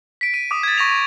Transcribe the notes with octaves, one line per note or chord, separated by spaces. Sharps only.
B6 D7
D#7
D6 D#6
G#6 A6
C#6 A#6 B6 F7
C#6